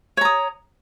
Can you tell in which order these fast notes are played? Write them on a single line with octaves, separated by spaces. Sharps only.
C#5 A#5 D#6